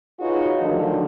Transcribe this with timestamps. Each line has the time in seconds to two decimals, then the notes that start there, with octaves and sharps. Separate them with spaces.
0.20 D#4 F4 F#4 G#4 B4 C#5
0.60 D3 D#3 F3 F#3 A3 D4